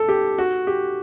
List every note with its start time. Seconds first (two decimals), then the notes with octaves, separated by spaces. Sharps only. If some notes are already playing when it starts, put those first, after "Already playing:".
Already playing: A4
0.08 G4
0.38 F#4
0.67 G4